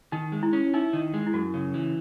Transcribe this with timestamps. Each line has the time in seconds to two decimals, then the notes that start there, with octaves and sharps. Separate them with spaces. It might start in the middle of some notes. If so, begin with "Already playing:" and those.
0.12 D#3 D#4
0.32 G#3
0.43 E4
0.53 C#4
0.74 D#4 E4
0.93 D#3
1.14 G#3
1.27 E4
1.34 F#2 F#4
1.54 C#3
1.74 E3